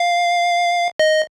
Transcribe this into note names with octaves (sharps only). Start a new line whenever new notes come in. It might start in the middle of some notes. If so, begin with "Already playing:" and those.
Already playing: F5
D#5